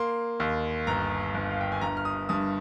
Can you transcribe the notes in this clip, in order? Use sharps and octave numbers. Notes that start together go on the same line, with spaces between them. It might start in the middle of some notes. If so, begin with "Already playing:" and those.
Already playing: A#3 C6
D#2
G1 A#5
G1
F5
G5
G#5
G2 A#5
F6
D#6
G2 D#6